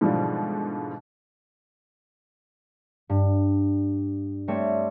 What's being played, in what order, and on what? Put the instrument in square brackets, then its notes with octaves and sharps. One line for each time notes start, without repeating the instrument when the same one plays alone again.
[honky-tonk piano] G#2 B2 D3 E3 F3 G3
[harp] G2
G3 A3 C4 C#5